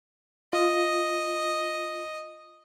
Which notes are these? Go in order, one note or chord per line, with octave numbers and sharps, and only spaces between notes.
F4 D#5